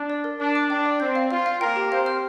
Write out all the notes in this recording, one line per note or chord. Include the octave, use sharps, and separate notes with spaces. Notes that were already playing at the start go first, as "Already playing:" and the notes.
Already playing: D4
D5
A#4
D4 D5
D6
D4 G5
D5
C4 G6
F5
F4 F5
F5
A#3 A#4 G5
G4
C4 C5 F5
F6